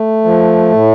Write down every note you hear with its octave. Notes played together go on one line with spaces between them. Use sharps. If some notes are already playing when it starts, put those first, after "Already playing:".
Already playing: A3
F3
A2